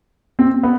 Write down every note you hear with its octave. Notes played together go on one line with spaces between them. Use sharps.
C4
B3